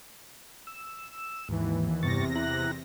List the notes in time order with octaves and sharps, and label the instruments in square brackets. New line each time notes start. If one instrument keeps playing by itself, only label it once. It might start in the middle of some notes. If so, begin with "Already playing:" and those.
[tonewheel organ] E6
[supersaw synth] D#2 E3 [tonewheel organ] G#2
[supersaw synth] E2 C3 A#6 [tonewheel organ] G2 C#6 A6
[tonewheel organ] E4 A#5 F#6